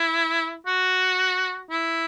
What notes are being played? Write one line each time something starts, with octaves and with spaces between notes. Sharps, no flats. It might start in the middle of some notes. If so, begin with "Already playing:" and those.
Already playing: E4
F#4
E4